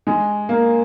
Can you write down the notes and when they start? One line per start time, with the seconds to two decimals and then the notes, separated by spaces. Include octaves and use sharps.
0.07 G#3
0.49 A#3